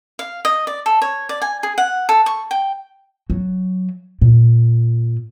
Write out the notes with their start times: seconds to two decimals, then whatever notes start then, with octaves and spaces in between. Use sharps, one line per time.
0.19 F5
0.45 D#5
0.67 D5
0.86 A4
1.02 C#5
1.29 D5
1.42 G#5
1.63 G#4
1.78 F#5
2.09 A4
2.26 C#6
2.51 G5
3.30 F#3
4.21 A#2